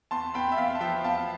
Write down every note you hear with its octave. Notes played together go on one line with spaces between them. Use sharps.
E2 A5 C6
E2 G5 B5
E5
E2 F5
A5
F3 E5 G5
E2 F5 A5